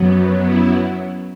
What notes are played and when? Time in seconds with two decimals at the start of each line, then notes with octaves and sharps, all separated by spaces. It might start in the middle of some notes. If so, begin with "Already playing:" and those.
Already playing: F#2 F#3 B3
0.45 E4